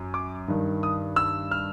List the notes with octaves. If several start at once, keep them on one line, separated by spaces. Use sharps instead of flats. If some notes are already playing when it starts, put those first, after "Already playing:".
Already playing: F#2
D6
G2 D#3
D#6
E6
F6